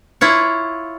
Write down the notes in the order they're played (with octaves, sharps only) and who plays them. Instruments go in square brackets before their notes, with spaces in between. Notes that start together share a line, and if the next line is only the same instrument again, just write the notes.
[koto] E4 F4 C#5